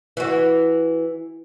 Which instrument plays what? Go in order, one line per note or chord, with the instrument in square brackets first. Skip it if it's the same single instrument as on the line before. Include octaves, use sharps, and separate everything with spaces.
[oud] E3 F#4